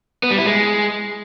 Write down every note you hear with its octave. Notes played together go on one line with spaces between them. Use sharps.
B3
G3
E4
G#3